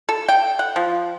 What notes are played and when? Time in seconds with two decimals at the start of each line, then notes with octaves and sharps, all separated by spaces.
0.09 A4
0.28 G5
0.59 F#5
0.76 F3